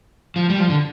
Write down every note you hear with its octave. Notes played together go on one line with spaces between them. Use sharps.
F3
G3
F3
D3